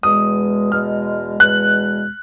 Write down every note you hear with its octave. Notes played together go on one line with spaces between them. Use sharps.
E2 B2 G#3 D#6
E2 B2 G#3 F6
E2 B2 G#3 F#6